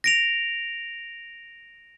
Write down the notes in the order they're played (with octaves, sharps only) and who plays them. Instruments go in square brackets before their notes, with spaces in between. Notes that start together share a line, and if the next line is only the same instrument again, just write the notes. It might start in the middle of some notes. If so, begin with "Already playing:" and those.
[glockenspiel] A#6 D7 F7